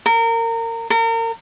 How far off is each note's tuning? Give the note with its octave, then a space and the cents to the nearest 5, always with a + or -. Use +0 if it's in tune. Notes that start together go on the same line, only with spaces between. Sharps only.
A#4 -25
A#4 -35